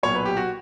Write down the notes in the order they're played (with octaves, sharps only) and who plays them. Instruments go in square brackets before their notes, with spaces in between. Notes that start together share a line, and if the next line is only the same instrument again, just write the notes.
[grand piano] B1 A#2 F#3 C#5
B4
G4
F#4